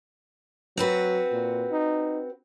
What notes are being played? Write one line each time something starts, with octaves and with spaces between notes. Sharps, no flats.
F#3 C4 F#4 B4
A#2
D#4